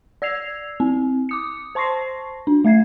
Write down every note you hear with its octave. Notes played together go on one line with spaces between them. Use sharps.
D5 E6 G#6 C7 F7
C4
D6 D#6 C#7
C5 A5 C6 C#6 A#6 C7
D4
A3 E5 G#6 C7